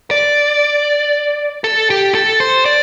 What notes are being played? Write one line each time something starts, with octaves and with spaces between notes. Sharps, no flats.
D5
A4
G4
A4
C5
D5